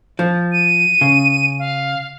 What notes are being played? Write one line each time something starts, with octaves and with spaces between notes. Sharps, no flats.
F3
D#7
C#3
F5